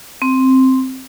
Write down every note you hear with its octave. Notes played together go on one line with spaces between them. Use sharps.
C4